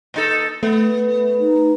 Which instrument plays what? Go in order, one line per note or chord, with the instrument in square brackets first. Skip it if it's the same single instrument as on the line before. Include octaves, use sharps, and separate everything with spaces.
[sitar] A#2 D#4 A4
[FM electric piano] A3 [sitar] B3
[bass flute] D#4